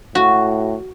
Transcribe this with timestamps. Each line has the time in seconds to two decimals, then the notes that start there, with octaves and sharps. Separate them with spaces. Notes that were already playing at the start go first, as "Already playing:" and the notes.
0.15 A2 F#4